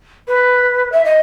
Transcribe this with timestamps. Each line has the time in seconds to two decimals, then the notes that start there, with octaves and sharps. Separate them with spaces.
0.28 B4
0.92 E5
1.05 D#5